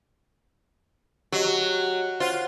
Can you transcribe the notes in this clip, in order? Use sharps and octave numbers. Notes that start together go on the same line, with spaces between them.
F#3 G4 D#5
F4 C5 C#5 F#5